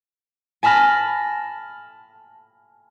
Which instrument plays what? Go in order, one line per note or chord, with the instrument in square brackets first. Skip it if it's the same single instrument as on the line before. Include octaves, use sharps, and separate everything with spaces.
[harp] G#5 A5 B5 F6 A#6